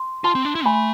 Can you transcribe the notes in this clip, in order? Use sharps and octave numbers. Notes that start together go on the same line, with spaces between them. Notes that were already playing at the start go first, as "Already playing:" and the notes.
Already playing: C6
F4 A5 C6
C4
D4
E4
A3 G#5 B5